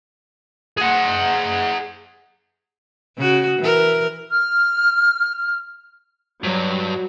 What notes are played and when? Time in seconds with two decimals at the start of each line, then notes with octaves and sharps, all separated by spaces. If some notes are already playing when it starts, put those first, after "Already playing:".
0.77 G#4 F#5
3.17 C#3 F#4
3.59 E3 A#4
4.30 F6
6.44 G2 F#3